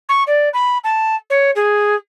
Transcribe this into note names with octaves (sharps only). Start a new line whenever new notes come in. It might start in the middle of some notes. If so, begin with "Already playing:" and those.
C#6
D5
B5
A5
C#5
G#4